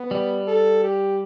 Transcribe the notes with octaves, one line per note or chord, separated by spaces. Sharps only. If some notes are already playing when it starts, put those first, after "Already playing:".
Already playing: B3
G3
A4
G4